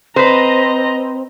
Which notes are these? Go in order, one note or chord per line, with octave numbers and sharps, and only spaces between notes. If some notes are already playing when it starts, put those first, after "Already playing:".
C4 B4 C5 D#5 A#5